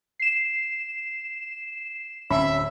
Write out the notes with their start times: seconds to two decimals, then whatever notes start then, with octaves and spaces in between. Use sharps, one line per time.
0.20 C7 E7
2.30 D1 C#4 E5 B5